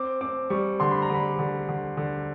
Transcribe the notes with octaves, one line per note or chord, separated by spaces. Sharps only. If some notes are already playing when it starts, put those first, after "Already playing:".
Already playing: C4 D6
C4 D6
G3 C#6
D3 C6
B5
A#5
D3 B5
D3
D3
D3